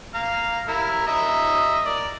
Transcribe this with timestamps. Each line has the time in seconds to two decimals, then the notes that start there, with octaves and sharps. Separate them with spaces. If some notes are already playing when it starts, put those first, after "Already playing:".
0.15 F5 A#5
0.68 E4 A#4 E5
1.07 D#5 E5 A#5
1.86 A#4 D5